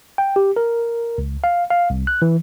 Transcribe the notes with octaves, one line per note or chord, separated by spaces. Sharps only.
G5
G4
A#4
C#2
F5
F5
C2
F#6
E3